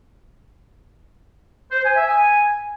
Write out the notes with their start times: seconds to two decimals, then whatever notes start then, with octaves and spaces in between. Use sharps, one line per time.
1.72 C5
1.84 G#5
1.96 E5
2.07 G#5